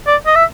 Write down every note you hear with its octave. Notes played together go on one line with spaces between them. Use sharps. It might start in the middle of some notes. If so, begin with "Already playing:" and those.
D5
D#5
E5